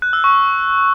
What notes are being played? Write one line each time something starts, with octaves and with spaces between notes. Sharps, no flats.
F#6
E6
C#6